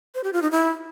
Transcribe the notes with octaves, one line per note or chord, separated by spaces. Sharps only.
C5
G4
F4
D#4
E4